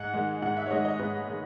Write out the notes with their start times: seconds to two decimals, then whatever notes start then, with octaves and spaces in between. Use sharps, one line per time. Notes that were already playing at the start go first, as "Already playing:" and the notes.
Already playing: G#2 F#5
0.14 D#3 G#3
0.42 G#2 F#5
0.57 E5
0.66 C#5
0.70 D#3 G#3 D#5
0.85 D#5
0.99 G#2 B4
1.27 D#3 G#3